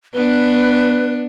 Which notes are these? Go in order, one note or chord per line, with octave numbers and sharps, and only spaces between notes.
B3 D4 B4